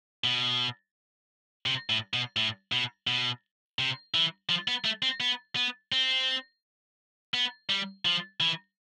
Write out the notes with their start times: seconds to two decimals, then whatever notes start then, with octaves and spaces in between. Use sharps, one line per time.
0.24 B2
1.66 C3
1.90 A2
2.14 B2
2.36 A2
2.72 B2
3.07 B2
3.79 C3
4.14 E3
4.49 F3
4.68 B3
4.85 A3
5.03 C4
5.20 B3
5.56 B3
5.92 C4
7.34 B3
7.70 G3
8.05 F3
8.40 E3